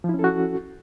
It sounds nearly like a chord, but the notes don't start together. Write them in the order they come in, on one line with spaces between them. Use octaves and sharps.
F3 E4 C#4 A4 F#4